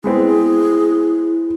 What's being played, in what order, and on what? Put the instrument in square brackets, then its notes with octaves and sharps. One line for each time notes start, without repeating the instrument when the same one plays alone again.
[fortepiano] G#3 B3 C4 [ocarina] E4 [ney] G#4